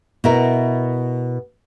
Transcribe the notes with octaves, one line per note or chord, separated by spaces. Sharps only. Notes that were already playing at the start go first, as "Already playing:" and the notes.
B2 E4 A#4